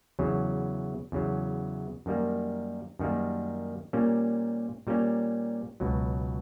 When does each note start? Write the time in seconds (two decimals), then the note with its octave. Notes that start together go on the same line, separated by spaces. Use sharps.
0.19 E2 C#3 F#3
1.12 E2 C#3 F#3
2.06 F#2 D#3 G3 A#3
2.99 F#2 D#3 G3 A#3
3.93 A#2 G3 A#3 C#4
4.87 A#2 G3 A#3 C#4
5.80 C#2 B2 F#3